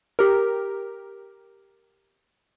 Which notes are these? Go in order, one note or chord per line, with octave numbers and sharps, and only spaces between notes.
G4 A#4